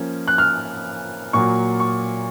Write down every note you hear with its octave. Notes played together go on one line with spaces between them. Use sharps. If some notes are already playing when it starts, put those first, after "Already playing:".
Already playing: F3 A#3 C#4
F#6
F6
A#2 F#3 A#3 C#6
C#6